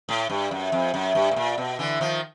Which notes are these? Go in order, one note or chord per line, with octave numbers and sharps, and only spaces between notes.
A2
G2
F#2
F2
F#2
G2
A2
A#2
B2
D3 E3
D#3 F3